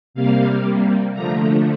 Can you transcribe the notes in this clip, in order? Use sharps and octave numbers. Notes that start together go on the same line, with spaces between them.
C3 G3 A#3 F5
D3 F3 A3 A#5